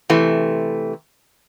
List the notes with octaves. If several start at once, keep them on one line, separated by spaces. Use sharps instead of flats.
C3 E3 A3